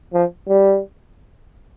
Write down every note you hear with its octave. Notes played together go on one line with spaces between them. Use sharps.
F3
G3